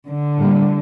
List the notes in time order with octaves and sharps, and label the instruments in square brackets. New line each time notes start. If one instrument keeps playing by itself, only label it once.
[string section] D3
[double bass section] A2 G3 A#3